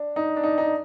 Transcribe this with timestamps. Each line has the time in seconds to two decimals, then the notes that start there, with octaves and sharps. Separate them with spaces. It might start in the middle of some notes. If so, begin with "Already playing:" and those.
Already playing: D4
0.16 D#4
0.36 D4
0.43 D#4
0.58 D#4